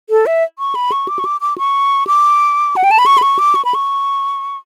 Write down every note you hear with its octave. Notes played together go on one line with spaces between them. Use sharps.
A4
E5
C#6
B5
C#6
D6
C#6
D6
D6
C#6
D6
F#5
G5
A5
B5
C#6
B5
C#6
D6
C#6
B5
C#6